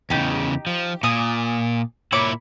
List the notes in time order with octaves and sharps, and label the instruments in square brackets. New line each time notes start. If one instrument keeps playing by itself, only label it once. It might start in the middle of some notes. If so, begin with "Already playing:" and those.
[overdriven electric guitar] E2 C#3 [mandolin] D#4 G4
[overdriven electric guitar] F3
[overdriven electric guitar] A#2 [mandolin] D5 G#5 D#6
[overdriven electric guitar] A#2 E4 [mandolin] C#5 B5 D6